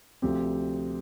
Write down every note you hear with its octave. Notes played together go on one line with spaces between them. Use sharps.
D2 C3 F3 C4 G4